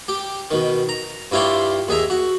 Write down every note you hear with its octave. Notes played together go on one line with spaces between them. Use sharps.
G4
B2 D#3
A#5
G2 E4 F4 G4 C#5 C6
D#2 G#4 E5 A#5
F#4